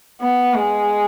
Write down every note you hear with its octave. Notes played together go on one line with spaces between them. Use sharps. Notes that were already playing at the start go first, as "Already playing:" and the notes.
B3
G#3